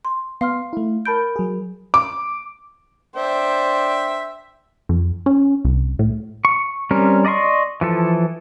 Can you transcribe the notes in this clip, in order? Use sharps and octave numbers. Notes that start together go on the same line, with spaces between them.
C6
B3 F5 C6 F6
A3 E4
A#4 A5 B5 G6 D7
F#3 G#4
D6
D4 C5 E5 G5
F2
C#4
C2
A2
C#6
G3 C4 C#4 A#4
D5 D#5 A#5 C6 C#6
E3 F3 A4